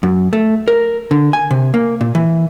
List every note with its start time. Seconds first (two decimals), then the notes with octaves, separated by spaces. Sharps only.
0.03 F#2
0.33 A3
0.68 A#4
1.11 D3
1.33 G#5
1.51 C3
1.74 A#3
2.01 A#2
2.15 E3